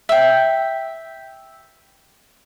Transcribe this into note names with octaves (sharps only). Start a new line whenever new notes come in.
E5 G5